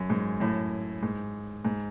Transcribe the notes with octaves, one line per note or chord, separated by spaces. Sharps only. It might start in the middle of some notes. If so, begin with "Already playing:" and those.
Already playing: F#2
G#2
F#2 A2
G#2
G#2